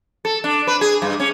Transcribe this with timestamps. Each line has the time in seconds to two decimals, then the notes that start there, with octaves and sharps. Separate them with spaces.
0.25 A4
0.44 D4
0.67 B4
0.81 G#4
1.02 G2
1.20 C#4